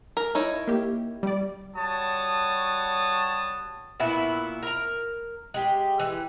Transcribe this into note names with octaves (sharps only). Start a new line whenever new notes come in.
A#4
D#4 E4 C#5
A#3 G4
G3 D5
G3 F#4 C#5 A5 D#6
A#2 B3 E4 F#4
A#4 A#5
G#3 G4
E3